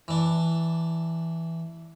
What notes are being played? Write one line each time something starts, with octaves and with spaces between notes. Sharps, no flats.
E3 D4